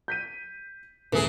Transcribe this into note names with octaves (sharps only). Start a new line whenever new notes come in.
G6 B6 D#7
D#1 E3 A3 G#4 A#4